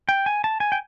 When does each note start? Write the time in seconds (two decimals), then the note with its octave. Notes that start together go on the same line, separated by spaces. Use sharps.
0.09 G5
0.26 G#5
0.44 A5
0.60 G#5
0.72 G5